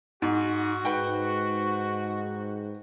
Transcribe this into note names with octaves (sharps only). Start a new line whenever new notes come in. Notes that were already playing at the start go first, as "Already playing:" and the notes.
G#2 F#4
G#2 B4 F#5 G5